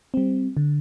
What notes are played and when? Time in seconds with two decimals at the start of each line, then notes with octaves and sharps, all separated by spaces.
0.14 G3 C4
0.57 D3